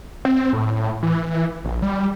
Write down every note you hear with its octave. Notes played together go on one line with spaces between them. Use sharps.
C4
A2
E3
A#1
G3